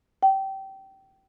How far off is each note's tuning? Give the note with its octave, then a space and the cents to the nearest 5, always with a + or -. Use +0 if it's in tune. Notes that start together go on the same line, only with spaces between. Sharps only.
G5 -20